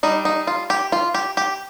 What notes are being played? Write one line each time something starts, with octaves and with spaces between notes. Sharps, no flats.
G3 D4 D#4
D#4
F4
G4
F4
G4
G4